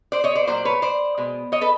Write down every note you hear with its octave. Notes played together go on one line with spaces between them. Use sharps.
C5 D5
C#5 D#5
C5 D5
A#2 F#3 A#3 C5 D5
B4 C#5
C5 D5
B2 G#3
C#5 D#5
A4 B4